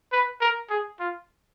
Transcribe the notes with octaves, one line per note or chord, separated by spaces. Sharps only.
B4
A#4
G#4
F4